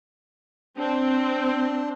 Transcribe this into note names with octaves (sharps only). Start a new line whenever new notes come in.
C4 D4